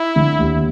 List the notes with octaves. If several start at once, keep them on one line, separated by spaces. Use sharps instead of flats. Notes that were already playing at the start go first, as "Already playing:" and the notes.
Already playing: E4
D3
D#2